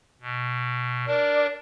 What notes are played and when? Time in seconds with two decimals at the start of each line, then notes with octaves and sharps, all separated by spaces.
0.21 B2
1.07 D4 A#4 D5